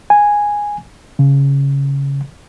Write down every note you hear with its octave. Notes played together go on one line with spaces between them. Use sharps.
G#5
C#3